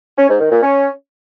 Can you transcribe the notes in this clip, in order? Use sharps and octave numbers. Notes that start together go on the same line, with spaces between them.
C#4
G#2
D#3
A#2
C#4